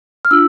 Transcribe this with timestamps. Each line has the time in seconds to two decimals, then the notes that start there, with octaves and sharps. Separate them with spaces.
0.25 F6
0.31 D4 F4 E6